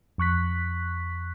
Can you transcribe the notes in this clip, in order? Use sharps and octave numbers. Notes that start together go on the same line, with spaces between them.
F2 C#6 F#6 B6